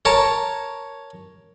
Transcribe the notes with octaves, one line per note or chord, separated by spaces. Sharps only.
A#4 C#5 A5